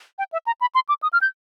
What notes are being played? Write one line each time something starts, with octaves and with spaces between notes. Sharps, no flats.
G5
E5
A#5
B5
C6
D6
D#6
F6
G6